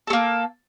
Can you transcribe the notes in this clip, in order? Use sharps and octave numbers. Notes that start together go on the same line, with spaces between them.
A3 A#3 A4